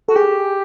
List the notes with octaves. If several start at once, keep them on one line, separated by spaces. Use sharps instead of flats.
F#4 A4
G4 G#4